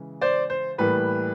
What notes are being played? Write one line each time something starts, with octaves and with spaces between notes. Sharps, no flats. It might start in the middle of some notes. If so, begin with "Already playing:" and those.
Already playing: C#3 E3 G#3
C5 D5
C5
A2 E3 G3 A#3 B4